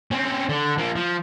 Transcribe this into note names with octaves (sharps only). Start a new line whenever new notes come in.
C4 C#4
D3
F3 A#3
F3